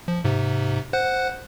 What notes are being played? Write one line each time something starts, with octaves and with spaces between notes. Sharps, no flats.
F3
G#2 C3
C5 F#5 F#6